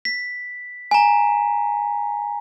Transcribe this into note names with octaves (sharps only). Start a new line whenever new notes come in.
B6
G#5 A#5